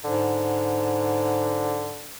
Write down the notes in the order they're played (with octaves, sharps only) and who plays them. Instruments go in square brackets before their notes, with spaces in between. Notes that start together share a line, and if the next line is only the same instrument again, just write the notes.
[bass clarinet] G#2 [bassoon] D3